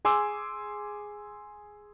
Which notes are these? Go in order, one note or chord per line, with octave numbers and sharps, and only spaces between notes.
G#4 G#5 C6 D6 E6